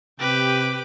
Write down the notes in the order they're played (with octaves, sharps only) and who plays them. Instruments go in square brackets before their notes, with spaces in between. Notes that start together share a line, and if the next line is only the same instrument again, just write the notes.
[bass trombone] C3 [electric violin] G4 B4 [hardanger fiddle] G5 D6